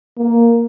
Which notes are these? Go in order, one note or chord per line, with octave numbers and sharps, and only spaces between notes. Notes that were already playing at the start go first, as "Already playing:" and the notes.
A#3